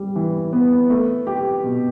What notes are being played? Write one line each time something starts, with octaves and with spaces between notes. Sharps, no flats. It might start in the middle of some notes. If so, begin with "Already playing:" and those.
Already playing: G3
E3
B3
A3
G4
B2